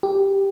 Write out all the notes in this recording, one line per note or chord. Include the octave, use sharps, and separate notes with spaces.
G4